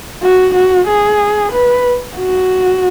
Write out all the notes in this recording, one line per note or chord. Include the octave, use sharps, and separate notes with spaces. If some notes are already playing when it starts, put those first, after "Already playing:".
F#4
F#4
G#4
B4
F#4